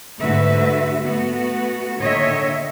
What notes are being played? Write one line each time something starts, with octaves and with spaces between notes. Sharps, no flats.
G#2 D3 A3 F#4 B4 E5
A3 B3 F#4
A#2 D3 D#3 C#5 D#5 E5